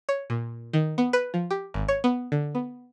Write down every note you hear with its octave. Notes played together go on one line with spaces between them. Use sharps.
C#5
A#2
D#3
B3
B4
F3
G4
G#1
C#5
B3
D3
B3